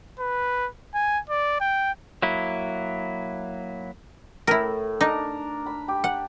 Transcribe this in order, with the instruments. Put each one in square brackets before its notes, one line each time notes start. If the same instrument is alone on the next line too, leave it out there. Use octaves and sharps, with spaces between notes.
[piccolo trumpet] B4
G#5
D5
G5
[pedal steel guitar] F#3 A#3 E4
[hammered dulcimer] A2 [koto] E4 A#4
[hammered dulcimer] D4 A#4 [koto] D#4
[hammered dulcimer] B5
G4
[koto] F#5